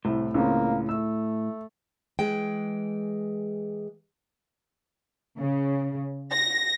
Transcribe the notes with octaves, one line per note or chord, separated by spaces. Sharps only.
C2 A2
C#2 C#3 A#3 C4
A3 E6
E3 G#3 G5
C#3
A#6